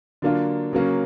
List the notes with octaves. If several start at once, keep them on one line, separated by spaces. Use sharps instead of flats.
D3 F#3 A#3 D4 F4
C#3 F#3 A#3 C#4